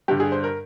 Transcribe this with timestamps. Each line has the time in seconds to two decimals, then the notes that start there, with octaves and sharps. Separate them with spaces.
0.08 G2 D3 G4
0.20 G#4
0.32 C5
0.44 A#4